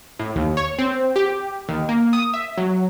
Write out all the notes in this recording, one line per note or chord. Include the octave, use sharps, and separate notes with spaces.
A2
D#2
C#5
C4
G4
D#2
A#3
D#6
E5
F#3